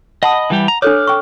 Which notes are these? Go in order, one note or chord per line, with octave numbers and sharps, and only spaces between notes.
D#5 F#5 A5 B5 D#6
E3 G3 G4
A#5
D4 A4 C#5 D6 F6 F#6
G5 C#6